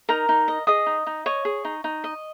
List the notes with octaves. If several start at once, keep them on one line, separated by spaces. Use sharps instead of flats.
D#4 A#4 A#5
D#4
D#5
G#4 D#5 D#6
D#4
D#4
C#5 D#5 C#6
G#4
D#4
D#4
D#5